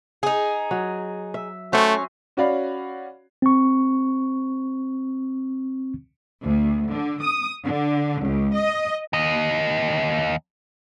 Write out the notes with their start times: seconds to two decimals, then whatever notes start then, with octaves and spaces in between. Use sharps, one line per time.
0.23 D#4 G#4
0.71 F#3
1.34 E5
1.73 A3 C#4 F#4 C5 E5
2.37 C#4 F#4 C#5 D5 F5 B5
3.42 C4 C#6
6.42 D2
6.90 D3
7.20 D#6
7.65 D3
8.23 C#2
8.55 D#5
9.13 D#2 D#5